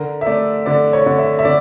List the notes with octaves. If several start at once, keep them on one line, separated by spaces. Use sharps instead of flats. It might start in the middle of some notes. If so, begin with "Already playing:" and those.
Already playing: D3 A#4
E5
A3 D5
D3 D5
C#5
D3
E5
E5
D3 D5